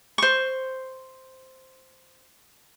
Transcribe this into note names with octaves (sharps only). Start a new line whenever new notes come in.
C5 C#6